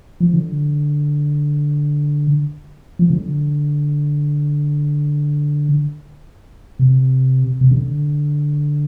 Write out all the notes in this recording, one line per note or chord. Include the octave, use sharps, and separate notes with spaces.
F3
D3
F3
D3
C3
C3
D3